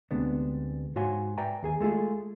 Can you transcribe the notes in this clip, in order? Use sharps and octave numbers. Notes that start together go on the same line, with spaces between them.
D2 C3 G#3 B3 D4
G#2 F#4 C#5 F5 G#5 C6
B4 D5 E5 G5 G#5 A#5
D#2 G#4 G#5
G#3 A3 F4 G#4